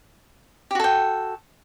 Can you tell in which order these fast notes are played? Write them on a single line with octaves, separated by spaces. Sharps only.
G4 F#4 A4 G5